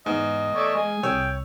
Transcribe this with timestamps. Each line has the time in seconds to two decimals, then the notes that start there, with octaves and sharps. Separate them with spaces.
0.06 E2 G#2 D#5
0.55 A3 C#5 D5
0.75 G#3 G#4
1.03 C2 C#5 G5 E6